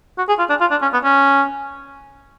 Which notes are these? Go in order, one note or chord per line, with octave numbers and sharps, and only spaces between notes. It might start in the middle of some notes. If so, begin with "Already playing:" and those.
F#4
G#4
F4
D4
F4
D4
C#4
B3
C#4